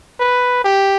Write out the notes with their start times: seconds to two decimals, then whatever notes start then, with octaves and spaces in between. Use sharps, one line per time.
0.20 B4
0.64 G4